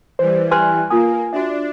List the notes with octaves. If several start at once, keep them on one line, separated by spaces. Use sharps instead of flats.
E3 G3 C5
G4 B4 G#5 C6 F#6
A#3 F4 G#5 D#6
D4 F#4 E5